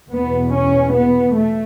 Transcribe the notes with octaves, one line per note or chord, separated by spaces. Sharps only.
E2 B2 B3
C#4
B3
A3